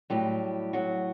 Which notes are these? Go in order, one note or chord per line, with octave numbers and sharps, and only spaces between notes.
A2 F#3 G3 G4
F#3 F#4